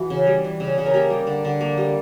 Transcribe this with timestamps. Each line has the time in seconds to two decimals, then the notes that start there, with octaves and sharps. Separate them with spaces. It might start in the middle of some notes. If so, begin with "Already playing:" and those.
Already playing: E3 F#4
0.10 C#3
0.27 G3
0.44 E3
0.60 C#3
0.78 C#3
0.86 A#4
0.94 A#3 G4
1.10 G3
1.27 D3
1.44 D3
1.61 A#3
1.77 G3